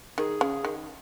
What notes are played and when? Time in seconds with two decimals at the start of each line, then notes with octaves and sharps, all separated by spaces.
0.18 D#3 G#4
0.41 C#3
0.65 D#3